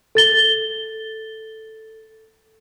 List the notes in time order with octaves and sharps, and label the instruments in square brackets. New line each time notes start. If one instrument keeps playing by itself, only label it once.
[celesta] A4 A6 G7